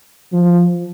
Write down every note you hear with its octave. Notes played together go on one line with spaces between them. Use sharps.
F3